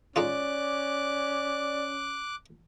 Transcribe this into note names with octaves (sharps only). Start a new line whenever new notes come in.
G#3 C#4 D#4 F4 D5 D6 F#6